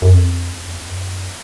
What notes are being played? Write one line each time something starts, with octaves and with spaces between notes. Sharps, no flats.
F#2
F2
E2
F2
E2
F#2